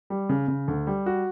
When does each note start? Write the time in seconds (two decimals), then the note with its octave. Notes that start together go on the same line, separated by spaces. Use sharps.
0.10 G3
0.29 C#3
0.48 C#3
0.68 D2
0.87 G3
1.06 F#4